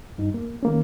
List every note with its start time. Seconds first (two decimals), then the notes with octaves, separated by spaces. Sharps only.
0.18 G2 D#4
0.34 A#3
0.63 D#3 A#3 C#4